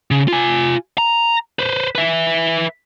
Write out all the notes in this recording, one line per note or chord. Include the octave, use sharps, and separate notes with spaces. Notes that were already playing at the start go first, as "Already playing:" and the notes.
C#3
F4 G#5
A#5
B4 C5
B4 E5